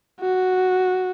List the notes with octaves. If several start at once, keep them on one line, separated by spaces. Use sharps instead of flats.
F#4